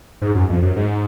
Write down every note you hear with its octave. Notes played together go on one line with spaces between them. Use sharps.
G#2
F#2
F2
F#2
G#2